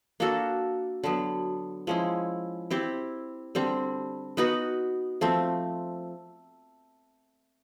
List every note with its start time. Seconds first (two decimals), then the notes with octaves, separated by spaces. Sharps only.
0.20 A#3 D4 F#4 A4
1.04 D3 F#3 B3
1.87 F3 G#3 C#4 E4
2.70 C4 E4 G4 C5
3.55 D3 G3 C4
4.37 B3 D#4 F#4 B4
5.21 F3 A3 C4